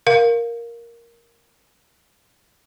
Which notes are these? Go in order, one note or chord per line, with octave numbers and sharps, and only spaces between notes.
A#4 F5